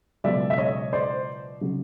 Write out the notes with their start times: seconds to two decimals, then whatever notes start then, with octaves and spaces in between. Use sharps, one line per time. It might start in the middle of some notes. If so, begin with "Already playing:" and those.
0.24 C#2 B2 F#3 D5 E5
0.50 E5
0.58 C#5 D#5
0.93 C5 D5
1.61 C#3 F#3